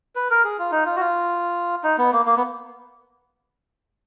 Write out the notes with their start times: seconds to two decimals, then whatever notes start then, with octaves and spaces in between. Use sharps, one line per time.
0.16 B4
0.30 A#4
0.44 G#4
0.59 F4
0.72 D#4
0.86 F4
0.96 F#4
1.00 F4
1.84 D#4
1.98 B3
2.13 A#3
2.25 A#3
2.37 B3